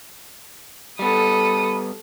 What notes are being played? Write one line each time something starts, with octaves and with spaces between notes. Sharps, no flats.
G3 B3 A4 B5 D#6